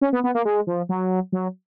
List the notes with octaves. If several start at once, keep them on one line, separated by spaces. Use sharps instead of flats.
C#4
B3
B3
A#3
G#3
F3
F#3
F#3